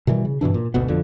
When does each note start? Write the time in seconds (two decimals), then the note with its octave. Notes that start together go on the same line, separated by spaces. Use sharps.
0.07 B2 D#3 E3 G3
0.25 C#3
0.41 G2 B2 E3 D4
0.54 A#2
0.74 G#1 D2 B2 B3
0.88 F2 D3 F3